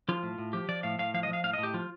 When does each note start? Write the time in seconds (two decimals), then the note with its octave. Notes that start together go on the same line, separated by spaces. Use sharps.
0.08 F3 F4
0.23 A2
0.38 A2
0.53 F3 G4
0.69 F3 D5
0.83 A2 F5
0.99 A2 F5
1.14 F3 F5
1.23 D#5
1.28 F3 F5
1.43 A2 F5
1.53 A2 D#5
1.63 G4
1.74 F3 F4